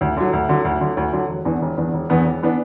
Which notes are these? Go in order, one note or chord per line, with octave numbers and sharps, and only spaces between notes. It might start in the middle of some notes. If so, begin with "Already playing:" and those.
D2
D3 F#3
D2
D3 F#3
D2
D3 F#3
D2
D3 F#3
E1
E2 E3 B3 D4
E1
E2 E3 B3 D4
E1
E2 E3 B3 D4
E1
E3 B3 D4